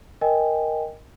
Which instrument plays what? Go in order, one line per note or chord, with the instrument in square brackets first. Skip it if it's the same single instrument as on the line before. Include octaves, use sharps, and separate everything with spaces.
[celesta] A#4 D#5 G5 G#5